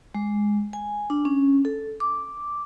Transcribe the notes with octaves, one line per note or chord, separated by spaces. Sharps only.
G#3
G#5
D4
C#4
A4
D6